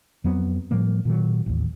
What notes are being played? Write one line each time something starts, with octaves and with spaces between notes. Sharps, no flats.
F2 F#3 B3 C4
A2 F3 G3 A#3
A#2 D#3 F#3
A1 D#2